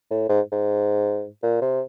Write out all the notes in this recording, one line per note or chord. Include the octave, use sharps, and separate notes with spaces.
A2
G#2
G#2
A#2
C3